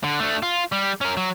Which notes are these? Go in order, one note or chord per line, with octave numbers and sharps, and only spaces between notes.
D3
A3 D4
F4
G3
C#4 A#4
F#3